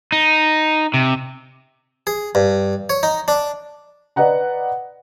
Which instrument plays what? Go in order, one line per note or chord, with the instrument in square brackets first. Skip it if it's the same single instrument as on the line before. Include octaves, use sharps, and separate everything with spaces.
[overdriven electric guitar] D#4
C3
[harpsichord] G#4
G2
C#5
D#4
D4
[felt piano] B4 D5 D#5 F#5 A#5